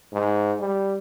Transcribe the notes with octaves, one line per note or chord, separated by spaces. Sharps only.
G#2
G3